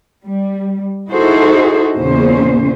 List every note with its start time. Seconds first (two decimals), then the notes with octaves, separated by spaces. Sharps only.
0.25 G3
1.11 D#4 E4 F#4 G#4 A4 C5
1.95 E2 A#2 C#3 C#4 C5